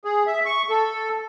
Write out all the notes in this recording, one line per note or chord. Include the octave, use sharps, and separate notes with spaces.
G#4
E5
C#6
A4